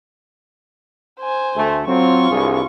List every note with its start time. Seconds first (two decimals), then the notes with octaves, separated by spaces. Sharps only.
1.21 C5 G#5
1.56 D2 A3
1.88 F#3 C4 F4 C#6
2.30 C2 G2 G#4